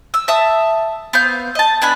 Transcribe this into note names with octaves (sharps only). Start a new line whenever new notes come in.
E6
E5 A5 D#6
B3 C4 F5 G6
D#5 A5
B3 D4 G#5 B5